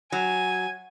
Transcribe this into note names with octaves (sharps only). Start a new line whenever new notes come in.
F#3 G#5